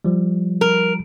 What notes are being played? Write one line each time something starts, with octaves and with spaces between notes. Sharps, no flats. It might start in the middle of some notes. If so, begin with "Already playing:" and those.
F3 G3
A#4